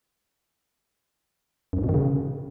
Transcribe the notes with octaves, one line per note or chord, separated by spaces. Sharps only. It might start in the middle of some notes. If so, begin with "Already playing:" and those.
F#2
G2
B2
D#3
C#3